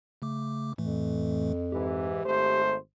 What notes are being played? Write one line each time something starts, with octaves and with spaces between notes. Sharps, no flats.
C#3 A3 D6
F2 A2 E3 A3
G#2 E3 G4
G#1 A3 C5